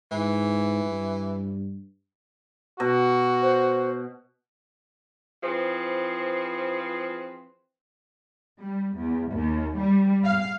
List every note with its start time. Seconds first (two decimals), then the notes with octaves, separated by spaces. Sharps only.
0.11 G#2 E3
0.84 G2
2.80 B2 F#4
3.41 C5
5.43 E3 F3 C4 G#4 B4
8.61 G3
8.98 E2
9.32 D#2
9.78 G3
10.25 F5